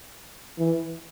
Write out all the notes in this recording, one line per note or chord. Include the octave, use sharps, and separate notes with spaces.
E3